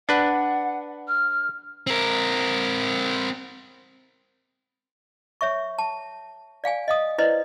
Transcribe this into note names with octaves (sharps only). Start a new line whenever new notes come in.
D4 B4 F#5
F6
C4 A#4
C#5 E5 C#6
A5
D5 F5 G5 G#5
D#5 F5 D#6
E4 B4 C5 D5 D#5